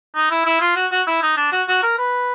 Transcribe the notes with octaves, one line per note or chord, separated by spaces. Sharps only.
D#4
E4
E4
F4
F#4
F#4
E4
D#4
D4
F#4
F#4
A#4
B4